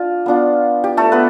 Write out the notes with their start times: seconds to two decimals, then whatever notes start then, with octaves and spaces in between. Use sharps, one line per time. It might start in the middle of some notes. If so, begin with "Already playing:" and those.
Already playing: D4 F4
0.26 B3 D4 F4
0.84 G4
0.97 A3 A4
1.12 B3 B4